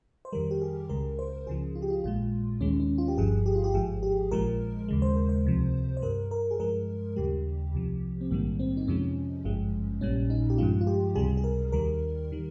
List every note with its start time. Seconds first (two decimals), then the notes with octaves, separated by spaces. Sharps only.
0.25 C5
0.32 F2 D#3 G3 A#4
0.51 G4
0.62 G#4
0.89 C#2 C#3 G#3 A#4
1.19 C5
1.46 C#2 C#3 F3 G#4
1.75 F4
1.82 G4
1.90 F4
2.03 A#1 A#2 G#3 F4
2.61 D#2 D#3 G#3 C#4
2.80 C#4
2.98 F4
3.08 G4
3.17 G1 G2 F3 G#4
3.46 G4
3.55 F4
3.64 G4
3.74 G#1 G#2 F3 G#4
4.03 G4
4.31 A#1 A#2 F3 G#3 A#4
4.88 D#2 C#3 G#3
5.02 C5
5.16 A#4
5.29 C5
5.45 C#2 C3 F3
5.97 C5
6.02 G2 G3 A#4
6.31 A#4
6.51 G#4
6.59 G2 F3 G#3 A#4
7.16 D#2 C#3 G3 G4
7.73 C2 C3 F3
8.21 C4
8.31 A#1 G#2 D#3 G3 A#3
8.59 C4
8.77 D#4
8.87 F2 C3 F3 G#3 C#4
9.45 G#1 G2 F3 G#3
10.01 A#1 A#2 G3 C#4
10.30 D#4
10.50 G4
10.58 G2 F3 G#3 F4
10.81 F4
10.87 G4
11.15 C#2 C3 G3 G#4
11.37 G#4
11.44 A#4
11.72 D#2 D#3 G3 A#4
12.32 D#3 G3